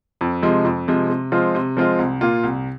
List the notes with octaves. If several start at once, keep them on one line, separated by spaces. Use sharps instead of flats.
F2
C3 F3 G#3
F2
C3 F3 G#3
C3
F3 G#3 C4 F4
C3
F3 G#3 C4 F4
C2
A#2 A#3 F4
C2